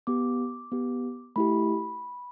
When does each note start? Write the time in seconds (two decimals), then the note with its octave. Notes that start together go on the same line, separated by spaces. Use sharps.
0.07 B3 G4 D6
0.72 B3 G4
1.36 A3 E4 G4 B5